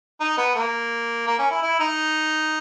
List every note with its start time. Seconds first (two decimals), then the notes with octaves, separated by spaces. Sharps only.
0.20 D#4
0.38 B3
0.55 A#3
1.27 A#3
1.39 C#4
1.50 E4
1.63 E4
1.80 D#4